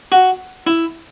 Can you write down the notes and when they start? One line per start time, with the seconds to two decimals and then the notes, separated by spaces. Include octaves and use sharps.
0.12 F#4
0.67 E4